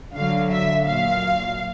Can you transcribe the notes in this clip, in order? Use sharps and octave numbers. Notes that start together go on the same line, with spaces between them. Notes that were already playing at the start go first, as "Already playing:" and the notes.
D3 F#3 F5
E5
A#2 F#3 F5